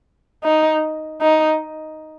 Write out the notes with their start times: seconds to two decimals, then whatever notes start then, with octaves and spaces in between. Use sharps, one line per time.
0.44 D#4
1.21 D#4